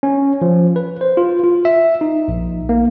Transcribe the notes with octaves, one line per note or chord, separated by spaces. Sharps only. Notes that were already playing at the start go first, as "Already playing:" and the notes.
C#4
F3
B4
C5
F4
F4
E5
D#4
A#1
A#3